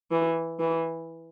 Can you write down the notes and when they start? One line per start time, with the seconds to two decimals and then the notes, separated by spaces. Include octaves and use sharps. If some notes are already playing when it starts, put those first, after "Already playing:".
0.11 E3
0.60 E3